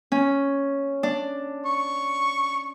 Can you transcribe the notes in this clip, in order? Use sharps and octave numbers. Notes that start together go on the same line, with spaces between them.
C#4
D4
C#6